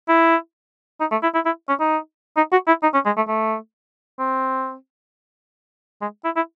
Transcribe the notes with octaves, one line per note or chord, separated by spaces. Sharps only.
E4
D#4
A3
E4
E4
E4
C#4
D#4
D#4
F#4
E4
D#4
C#4
G#3
A3
A3
C4
G#3
E4
E4